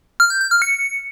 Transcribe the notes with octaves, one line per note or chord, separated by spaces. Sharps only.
F6
G6
G6
F6
C#7